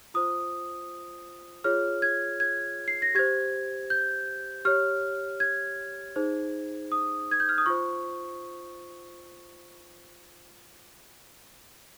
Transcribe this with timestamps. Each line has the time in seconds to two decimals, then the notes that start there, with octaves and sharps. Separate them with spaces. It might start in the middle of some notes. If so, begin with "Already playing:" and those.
0.14 F4 C5 D#6
1.64 F4 G#4 C#5 F6
2.02 G#6
2.40 G#6
2.88 C7
3.02 A#6
3.15 G4 C5 G#6
3.90 G6
4.65 G4 C#5 F6
5.40 G#6
6.16 D#4 G#4 C5
6.92 D#6
7.31 G#6
7.40 G6
7.49 F6
7.58 D#6
7.66 F4 C5 C#6